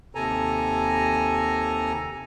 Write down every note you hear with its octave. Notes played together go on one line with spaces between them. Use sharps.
D#2 C3 A4 G#5 A#5